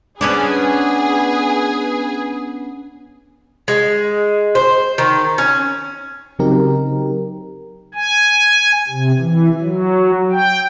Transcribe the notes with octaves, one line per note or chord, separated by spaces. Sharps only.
B3 C#4 D4 G#4 B4
G#3
C5
D#3
C#4
C#3 F#3 C4 D#4 G4 A#4
G#5
C3
E3
F#3
G5